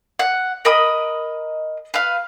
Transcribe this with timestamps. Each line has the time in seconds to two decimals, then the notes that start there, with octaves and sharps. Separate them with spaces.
0.19 F#5
0.65 A#4 D#5 B5 D#6
1.94 B4 F5